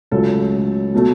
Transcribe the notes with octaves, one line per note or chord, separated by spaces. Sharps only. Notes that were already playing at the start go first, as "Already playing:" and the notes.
C#2 C#3 F#3 A3 A4
B2 F#3 A3